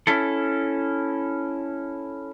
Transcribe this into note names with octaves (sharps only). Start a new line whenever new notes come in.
C#4 E4 A4